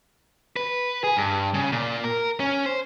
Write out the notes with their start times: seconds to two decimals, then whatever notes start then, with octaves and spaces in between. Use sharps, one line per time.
0.56 B4
1.04 G#4
1.17 G2
1.54 C#3
1.72 A#2
2.04 A#4
2.40 C#4
2.66 C5